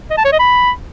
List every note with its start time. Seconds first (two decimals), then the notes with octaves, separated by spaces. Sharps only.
0.10 D#5
0.18 A5
0.25 C#5
0.32 D#5
0.40 B5